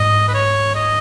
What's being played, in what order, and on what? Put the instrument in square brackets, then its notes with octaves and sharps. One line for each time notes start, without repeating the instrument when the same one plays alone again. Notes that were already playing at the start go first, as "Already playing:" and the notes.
Already playing: [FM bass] G#2 [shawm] D#5
[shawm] B4
C#5
D#5